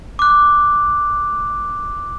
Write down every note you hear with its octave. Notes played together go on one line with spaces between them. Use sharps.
D6 F#6